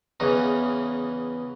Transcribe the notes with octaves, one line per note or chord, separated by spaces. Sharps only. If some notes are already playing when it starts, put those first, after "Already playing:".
E2 C#3 E3 D#4